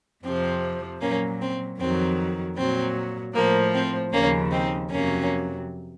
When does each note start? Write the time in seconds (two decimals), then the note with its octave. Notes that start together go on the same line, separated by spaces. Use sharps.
0.24 F2 C3 F3 C4
1.01 A#2 F#3 A#3 C#4
1.41 C4
1.80 F2 D#3 F#3 C4
2.57 A#2 F#3 C4
3.35 A2 F3 A#3
3.74 C4
4.13 D#2 C#3 F3 A#3 C#4
4.52 C4 D#4
4.90 F2 C3 F#3 A#3 C#4